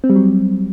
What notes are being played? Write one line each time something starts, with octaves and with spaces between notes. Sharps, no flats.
C4
G3
F#3